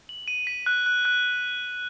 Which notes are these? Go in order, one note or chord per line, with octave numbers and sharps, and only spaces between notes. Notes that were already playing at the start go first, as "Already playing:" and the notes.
F#7
D#7
B6
F#6
F#6
F#6